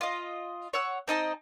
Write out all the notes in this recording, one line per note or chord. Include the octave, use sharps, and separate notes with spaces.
F4 D#5
C#5 F#5 E6
C4 D#4 D#5 A5